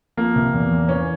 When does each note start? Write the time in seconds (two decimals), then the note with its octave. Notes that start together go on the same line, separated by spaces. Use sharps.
0.17 F3 A#3
0.36 C3
0.53 E2
0.71 E2
0.88 E3 C#4